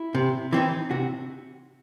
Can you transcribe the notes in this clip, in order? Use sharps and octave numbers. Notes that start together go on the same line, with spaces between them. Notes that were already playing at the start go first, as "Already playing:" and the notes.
Already playing: E4
C3
E3 C4 D#4
C3 F#4